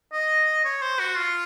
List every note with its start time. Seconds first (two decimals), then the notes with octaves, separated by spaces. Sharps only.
0.13 D#5
0.64 C#5
0.82 C5
1.00 F#4
1.17 F4